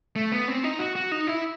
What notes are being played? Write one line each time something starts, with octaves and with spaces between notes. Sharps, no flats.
A3
B3
C4
D#4
F#4
F#4
D#4
E4